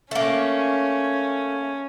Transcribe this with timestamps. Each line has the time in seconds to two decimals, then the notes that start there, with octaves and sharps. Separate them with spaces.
0.11 A3 A#3 C#4